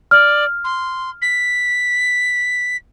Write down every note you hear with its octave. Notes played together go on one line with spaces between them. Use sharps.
D5 F6
C6
B6